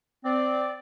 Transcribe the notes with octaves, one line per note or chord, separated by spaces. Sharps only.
C4 D5